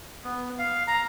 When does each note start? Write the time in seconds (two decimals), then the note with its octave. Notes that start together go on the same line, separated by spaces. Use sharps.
0.24 B3
0.59 F5
0.87 A#5